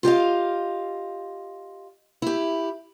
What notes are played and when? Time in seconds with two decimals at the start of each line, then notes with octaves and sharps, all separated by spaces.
0.03 F4 G4 D#5 F5
2.22 E4 G4